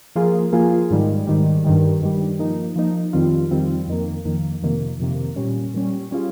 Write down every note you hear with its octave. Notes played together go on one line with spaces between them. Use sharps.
F3 A#3 F4 G#4
F3 A#3 F4 G#4
G#2 D#3 G3
G#2 D#3 G3
G2 D#3 G3
G2 D#3 G3
F3 A#3 D#4
F3 A#3 D#4
F2 D#3 G3 C4 F4
F2 D#3 G3 C4 F4
F2 D#3 A#3
F2 D#3 A#3
F2 C3 D#3 A#3
F2 C3 D#3 A#3
A#2 G3 C#4
A#2 G3 C#4
G3 C#4 F4 G#4